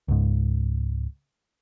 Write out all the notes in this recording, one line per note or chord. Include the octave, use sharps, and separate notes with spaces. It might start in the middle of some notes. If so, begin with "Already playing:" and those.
C#2 G#2